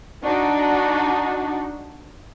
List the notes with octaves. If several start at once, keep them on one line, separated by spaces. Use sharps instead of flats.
D4 D#4 F#4